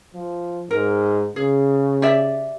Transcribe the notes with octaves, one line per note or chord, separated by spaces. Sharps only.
F3
G#2 A#4
C#3 G#4
G4 D5 E5